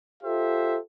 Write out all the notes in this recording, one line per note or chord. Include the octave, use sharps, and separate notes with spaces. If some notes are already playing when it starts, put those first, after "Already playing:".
F4 G4 A4 C5 E5